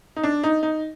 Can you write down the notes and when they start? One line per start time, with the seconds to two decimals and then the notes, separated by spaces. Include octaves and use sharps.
0.16 D#4
0.23 D4
0.44 D#4
0.63 D#4